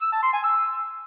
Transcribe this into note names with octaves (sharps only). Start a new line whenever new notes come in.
E6
A5
C6
G#5
E6